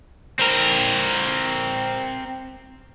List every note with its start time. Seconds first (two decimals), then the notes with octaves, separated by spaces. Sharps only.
0.39 C4 A#4